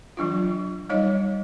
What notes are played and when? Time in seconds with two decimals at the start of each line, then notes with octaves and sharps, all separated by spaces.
0.17 E3 F#3 D4 F4
0.89 G3 D#4 C#5 D#5